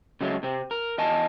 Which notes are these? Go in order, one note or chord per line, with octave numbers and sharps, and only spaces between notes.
C#3 F#3 G#3 A3
C3 C4
A#4
E2 D#5 G#5 A5